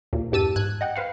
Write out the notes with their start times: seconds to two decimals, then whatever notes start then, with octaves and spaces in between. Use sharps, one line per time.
0.13 D#2 A#2
0.32 E2 G2 G4 A5 E6 D#7
0.56 G#2 F#6 G#6
0.81 D#5 F#5 G5
0.96 B4 C5 F5 F#5